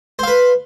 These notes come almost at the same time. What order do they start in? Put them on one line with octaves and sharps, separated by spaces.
C5 F5 B4